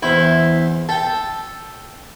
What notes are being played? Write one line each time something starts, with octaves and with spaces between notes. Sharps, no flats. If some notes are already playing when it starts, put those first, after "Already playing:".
E2 E4 C5
A4 G5 A5